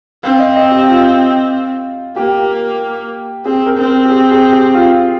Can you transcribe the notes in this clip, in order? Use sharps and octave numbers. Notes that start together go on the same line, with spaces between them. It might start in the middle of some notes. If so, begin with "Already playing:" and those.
C4 F5
D#5
D#5
G4
F4
A#3 G4
C4 G#4
A#4
C4
A#4
G4
G#4
G#4
G4
F4